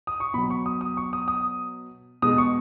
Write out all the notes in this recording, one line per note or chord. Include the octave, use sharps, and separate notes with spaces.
D#6
C#6
B2 F#3 B5
C#6
D#6
D#6
C#6
D#6
D#6
B2 G#3 D#6
C#6